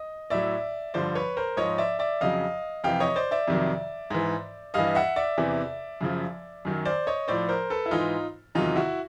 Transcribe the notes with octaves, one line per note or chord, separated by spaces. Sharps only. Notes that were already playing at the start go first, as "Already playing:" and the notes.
Already playing: D#5
A2 F#3 D5 E5
G2 D3 F3 C5 D5
B4 C#5
A#4 C5
G#2 F3 C#5 D#5
D5 E5
D5 E5
F2 C#3 F#3 D#5 F5
F2 C3 E3 F5 G5
C#5 D#5
C5 D5
D5 E5
F2 C3 D#3 F#3
G#2 E3
G2 E3 D#5 F5
E5 F#5
D5 E5
E2 C3 E3
F#2 C#3 F3
F#2 D#3 F#3
C5 D5
C#5 D#5
A2 F3 C5 D5
A#4 C5
A4 B4
E4
G#2 E3 D#4 F4
E2 C3 D#3 F#3 D#4 F4
E4 F#4